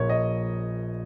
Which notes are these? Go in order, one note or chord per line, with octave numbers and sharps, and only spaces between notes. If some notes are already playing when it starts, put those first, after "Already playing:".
Already playing: A#1 A#2 A#3 C#4 C#5
D#5